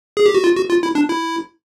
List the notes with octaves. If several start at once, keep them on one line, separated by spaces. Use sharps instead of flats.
G#4
G4
F#4
F4
F#4
F4
E4
D4
E4